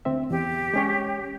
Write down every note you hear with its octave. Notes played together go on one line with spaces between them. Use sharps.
D2 C4 E5
E2 G4
G#3 C#4 C#5